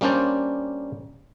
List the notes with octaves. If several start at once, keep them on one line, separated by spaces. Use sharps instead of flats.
G3 A#3 C#4 D4 C5 D5